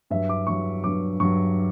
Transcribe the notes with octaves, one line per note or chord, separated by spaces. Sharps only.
G2 F#3 E5
D6
G2 F#3 C#6
G2 F#3 D6
G2 F#3 C#6